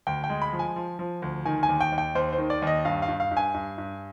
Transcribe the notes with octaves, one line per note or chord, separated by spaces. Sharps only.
D2 G5
G5
G#3
B5
F3
G#5
F3
F3
D2
D#3 G#5
G#5
D#2
G5
D#2
G5
D#2 C5
C5
D#3
D5
D#2
D#5
G2 F5
F5
G2
F5
G2
G#5
G2
G2